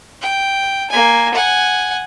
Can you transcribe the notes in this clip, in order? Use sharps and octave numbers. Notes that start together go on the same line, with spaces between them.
G5
A#3 G#5
F#5 G#5